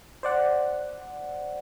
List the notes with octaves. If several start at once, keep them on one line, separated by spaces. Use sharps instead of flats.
C5 D5 F#5